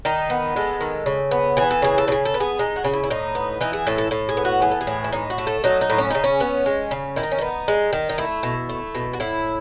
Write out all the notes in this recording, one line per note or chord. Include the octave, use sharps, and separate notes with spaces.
D#3 D#4
B3
G#3 A4
D#3
C#3
B3
E3 G#4
A4
C#3 G#4
A4
C#3 G#4
A4
B3
G#4
G#3 D#4
F#4
C#3
E4
E4
A2 D#4
B3
E3 D#4
G#4
A2 A4
A4
A2 A4
G#4
B3
F#4
E3 G#4
A4
G#4
A2
E4
A2 D#4
F#4
A3
A4
F#3 D#4
D#4
A2
C#4
C#3 D#4
C#4
B3
G#3
C#3
D#3 E4
D#4
C#4
B3 D#4
G#3
D#3
D#4
A3 E4
B2
A3
B2
F#4
A2 E4